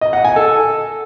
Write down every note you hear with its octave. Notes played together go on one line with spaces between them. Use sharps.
D#5
F#5
G#5
A4